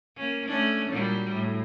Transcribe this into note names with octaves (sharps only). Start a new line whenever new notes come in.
A#3 C#4
A3 C#4 D4
A#2 F#3 G3
A2